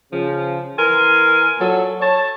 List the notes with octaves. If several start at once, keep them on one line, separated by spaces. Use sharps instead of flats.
C#3 F3
E3 A#4 G#5 C6
A#2 F#3 A4
C#5 A5